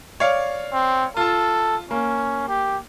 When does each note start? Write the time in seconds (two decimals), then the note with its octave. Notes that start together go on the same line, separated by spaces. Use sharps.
0.20 C#5 D5 F5
0.73 C4
1.17 F4 A4 A5
1.91 A#3 C#4
2.49 G4